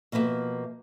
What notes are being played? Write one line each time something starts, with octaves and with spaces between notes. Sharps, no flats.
B2 F3 A#3 B4 E5